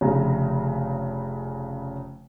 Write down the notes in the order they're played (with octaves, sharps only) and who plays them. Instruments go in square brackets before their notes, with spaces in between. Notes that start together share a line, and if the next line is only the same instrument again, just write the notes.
[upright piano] F1 C#3 A#5